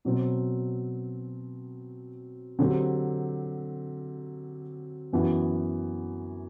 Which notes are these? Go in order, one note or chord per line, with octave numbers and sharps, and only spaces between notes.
B2 F#3 C4
D3 F#3 C4 G4
F#2 E3 B3 F#4